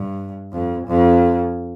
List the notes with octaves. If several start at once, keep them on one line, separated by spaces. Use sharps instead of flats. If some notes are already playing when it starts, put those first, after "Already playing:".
Already playing: G2
F2
F2